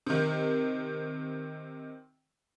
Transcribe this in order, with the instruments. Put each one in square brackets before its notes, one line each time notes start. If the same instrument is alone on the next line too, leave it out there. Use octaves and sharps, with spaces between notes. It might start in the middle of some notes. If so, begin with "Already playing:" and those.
[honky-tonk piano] C3 D#3